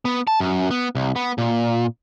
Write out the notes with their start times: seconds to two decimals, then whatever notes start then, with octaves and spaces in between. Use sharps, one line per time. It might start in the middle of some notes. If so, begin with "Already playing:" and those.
0.05 B3
0.27 A5
0.40 F#2
0.71 B3
0.95 C2
1.16 B3
1.38 A#2